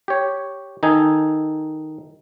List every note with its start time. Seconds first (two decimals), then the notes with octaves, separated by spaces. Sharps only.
0.08 G4 C#5
0.83 D#3 D#4 A4 G#5